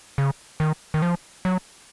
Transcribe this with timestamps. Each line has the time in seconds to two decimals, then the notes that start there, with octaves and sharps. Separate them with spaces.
0.18 C#3
0.60 D#3
0.94 D#3
1.02 F3
1.45 F#3